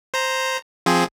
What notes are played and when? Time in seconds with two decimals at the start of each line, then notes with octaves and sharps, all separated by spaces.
0.14 C5 A#5
0.86 F3 C4 G#4